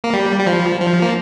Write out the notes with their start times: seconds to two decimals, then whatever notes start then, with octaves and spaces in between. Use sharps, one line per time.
0.04 A#3
0.13 G3
0.40 G3
0.47 F3
0.80 F3
1.02 A#3